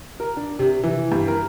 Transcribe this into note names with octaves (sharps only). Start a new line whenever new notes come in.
A#4
D4
C3
E3
G2
A#4